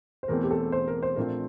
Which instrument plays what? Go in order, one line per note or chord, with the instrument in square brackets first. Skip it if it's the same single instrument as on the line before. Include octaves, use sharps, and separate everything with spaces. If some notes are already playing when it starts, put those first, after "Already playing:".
[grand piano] C5
[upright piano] E1 E2 E3 A3 C4 [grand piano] A#4
[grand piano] G4
A4
C5
A#4
C5
[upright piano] A#1 A#2 A3 C4 F4 [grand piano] A#4